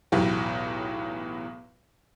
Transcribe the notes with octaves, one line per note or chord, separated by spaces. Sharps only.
B1 E2 A2 F#3 G4